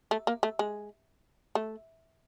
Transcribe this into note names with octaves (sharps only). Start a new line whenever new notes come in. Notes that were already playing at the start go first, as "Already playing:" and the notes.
A3
A#3
A3
G#3
A3